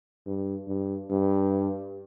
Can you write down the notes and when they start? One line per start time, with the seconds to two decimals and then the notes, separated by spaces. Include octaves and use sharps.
0.26 G2
0.68 G2
1.10 G2